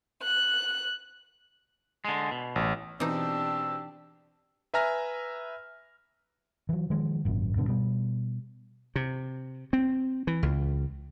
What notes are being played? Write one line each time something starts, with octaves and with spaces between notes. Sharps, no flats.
F#6
D3 G#3
B2
A1
B2 E3 C4 D4 D#4 G4 E6
B4 E5 G#5 A#5 F6 A#6
E3 F#3
D#3 F3 G#3
G#1 F#2 A#2
G2 B2 D3
B2 G3
C3
C4
E3
C#2